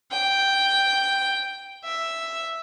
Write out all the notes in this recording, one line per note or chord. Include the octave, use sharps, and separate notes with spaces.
G5
E5